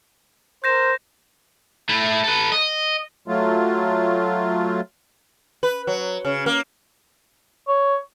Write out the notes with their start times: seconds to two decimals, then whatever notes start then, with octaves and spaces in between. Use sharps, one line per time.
0.64 A#4 C5 G6 A#6 E7
1.89 A3 E4
2.24 A4 B4
2.52 D#5
3.28 F#3 A3 F4
5.63 B4
5.87 F#3
6.25 C#3
6.46 A#3
7.68 C#5